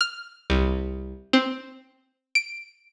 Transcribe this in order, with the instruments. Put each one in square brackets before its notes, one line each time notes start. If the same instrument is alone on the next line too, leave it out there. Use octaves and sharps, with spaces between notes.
[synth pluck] F6
C2
C4
D7